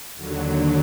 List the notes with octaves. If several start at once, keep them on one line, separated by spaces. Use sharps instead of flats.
D#2 D3 F#3